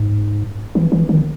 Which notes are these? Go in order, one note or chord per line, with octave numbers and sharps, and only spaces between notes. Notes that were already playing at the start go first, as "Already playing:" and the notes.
Already playing: G#2
E3
E3
D#3